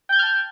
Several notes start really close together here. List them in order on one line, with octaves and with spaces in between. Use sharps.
G5 G6 G#6 F6 A5